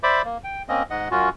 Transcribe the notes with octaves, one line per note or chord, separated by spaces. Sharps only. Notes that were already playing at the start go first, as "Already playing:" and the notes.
C5 D5 E5 B5 D6
A#3
G5
A#3 C4 C#4 D#5
G#2 D#5 F#5
F#2 C#4 F4 F#4